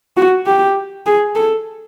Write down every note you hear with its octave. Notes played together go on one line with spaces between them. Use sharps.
F#4
G4
G#4
A4